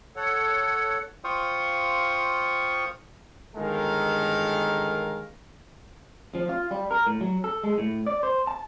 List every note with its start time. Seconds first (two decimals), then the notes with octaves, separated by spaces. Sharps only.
0.16 A4 C#5 F#5
1.24 F4 C5 F5 G5 C#6 D#6
3.56 G1 D#3 G#3 A4 A#4 F5
6.35 F3
6.49 F4
6.71 G3
6.91 A#4
7.07 A2
7.21 F#3
7.44 A4
7.64 G#3
7.78 A2
8.07 D5
8.23 C5
8.47 A5